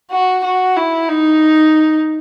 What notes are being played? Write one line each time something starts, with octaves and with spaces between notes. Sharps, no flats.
F#4
F#4
E4
D#4